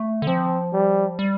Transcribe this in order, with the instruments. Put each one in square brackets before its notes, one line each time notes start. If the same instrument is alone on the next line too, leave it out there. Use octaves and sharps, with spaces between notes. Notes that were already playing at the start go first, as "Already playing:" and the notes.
Already playing: [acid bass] A3
D3
[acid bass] F3 [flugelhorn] C4
[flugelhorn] G3
[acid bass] G3